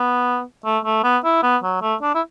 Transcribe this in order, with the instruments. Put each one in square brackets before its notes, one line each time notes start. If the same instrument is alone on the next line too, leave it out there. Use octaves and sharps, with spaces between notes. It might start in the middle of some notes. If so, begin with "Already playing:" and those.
Already playing: [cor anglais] B3
A3
A3
B3
E4
B3
F#3
A3
D4
E4